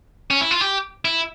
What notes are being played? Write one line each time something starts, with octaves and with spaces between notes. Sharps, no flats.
C#4
E4
F4
G4
E4